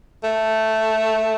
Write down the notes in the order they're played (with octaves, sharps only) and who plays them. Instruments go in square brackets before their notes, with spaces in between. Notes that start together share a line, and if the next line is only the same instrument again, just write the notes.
[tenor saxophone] A3